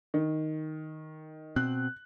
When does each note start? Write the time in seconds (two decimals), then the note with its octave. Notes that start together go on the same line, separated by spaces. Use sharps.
0.14 D#3
1.56 B2 C4 F#6